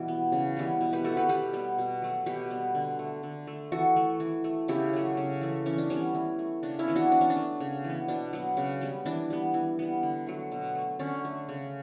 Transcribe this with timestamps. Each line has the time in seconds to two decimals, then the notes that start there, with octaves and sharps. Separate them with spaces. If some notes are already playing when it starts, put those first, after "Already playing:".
Already playing: B2 E3 G3
0.08 B3
0.32 C#3
0.57 E3 G3 B3
0.81 B2
0.93 G4 B4
1.04 A3 F#4 A4
1.17 G4 B4
1.29 B2 G4 B4
1.53 G3 B3
1.78 B2
2.02 F#3 A3
2.26 B2 G4 B4
2.50 G3 B3
2.75 D3
2.99 A3
3.23 D3
3.47 A3
3.72 E3 F#4 A4
3.96 A3
4.20 E3
4.44 A3
4.68 C#3 E4 G4
4.93 F#3 A3
5.17 C#3
5.41 E3 A3
5.66 E3 C#4
5.78 D4
5.90 G3 B3 C#4
6.15 E3
6.39 A3
6.63 C#3 D4
6.79 C#4 E4
6.88 E3 B3
6.96 D4 F#4
7.12 E3 D4
7.21 C#4
7.30 D4
7.36 A3
7.60 C#3
7.84 E3 B3
8.08 B2 D4
8.33 F#3 B3
8.57 C#3
8.81 G3 B3
9.06 E3 D4
9.30 G3 B3
9.54 E3
9.79 G3 B3
10.03 D3
10.27 F#3 A3
10.52 B2
10.75 A3
10.99 D3 C#4
11.25 A3
11.49 C#3